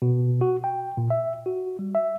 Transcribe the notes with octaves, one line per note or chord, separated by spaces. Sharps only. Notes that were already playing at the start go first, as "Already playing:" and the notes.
B2
F#4
G5
A#2
E5
F#4
G3
E5